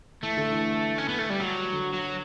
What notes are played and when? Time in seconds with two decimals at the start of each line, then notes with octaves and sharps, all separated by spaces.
0.23 E3 A3
0.37 D3
0.51 E3
0.98 C#4
1.09 B3
1.19 A3
1.30 G3
1.40 F#3
1.72 D3
1.94 F#3